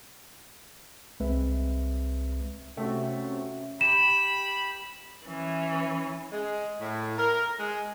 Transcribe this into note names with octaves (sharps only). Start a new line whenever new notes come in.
C2 G#3 C4 G#4 B4 E5
C3 A3 C#4 F#4 E5 G5
G4 B5 E7
E3 C#4
G#3
A2
A#4
G#3